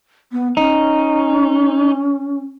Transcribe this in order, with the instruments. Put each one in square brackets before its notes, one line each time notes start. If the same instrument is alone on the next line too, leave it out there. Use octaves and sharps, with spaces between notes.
[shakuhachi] B3
[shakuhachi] C#4 [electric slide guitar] D#4